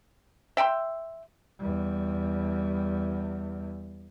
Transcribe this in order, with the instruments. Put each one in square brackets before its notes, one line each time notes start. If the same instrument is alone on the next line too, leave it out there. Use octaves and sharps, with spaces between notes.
[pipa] E5 G5 A#5 C6
[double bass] E2 G3